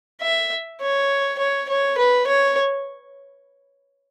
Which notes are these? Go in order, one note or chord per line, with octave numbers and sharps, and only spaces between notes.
E5
C#5
C#5
C#5
B4
C#5